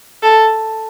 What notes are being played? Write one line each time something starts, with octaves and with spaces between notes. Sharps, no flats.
A4